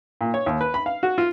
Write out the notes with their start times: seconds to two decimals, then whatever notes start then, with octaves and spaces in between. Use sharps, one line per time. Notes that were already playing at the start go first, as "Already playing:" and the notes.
0.21 A#2
0.34 C#5
0.46 D#2
0.61 B4
0.74 B5
0.86 F5
1.03 F#4
1.18 F4